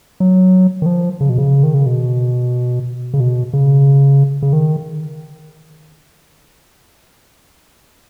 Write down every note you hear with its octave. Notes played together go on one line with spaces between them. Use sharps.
F#3
D#3
F3
C#3
B2
C#3
D#3
C#3
B2
C#3
B2
C#3
C#3
D#3